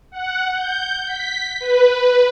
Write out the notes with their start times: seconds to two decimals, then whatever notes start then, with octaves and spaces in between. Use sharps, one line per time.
0.12 F#5
0.54 G6
1.06 B6
1.60 B4